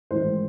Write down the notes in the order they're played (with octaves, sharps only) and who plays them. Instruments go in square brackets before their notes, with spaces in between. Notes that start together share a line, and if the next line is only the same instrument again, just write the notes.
[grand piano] A1 G#2 D#3 G#3 C5